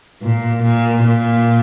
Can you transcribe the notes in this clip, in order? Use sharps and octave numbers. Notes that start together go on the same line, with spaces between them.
A#2
A#2
A#2